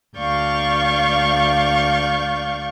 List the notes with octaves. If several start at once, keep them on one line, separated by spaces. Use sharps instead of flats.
D2 D5 F5 C#6 G6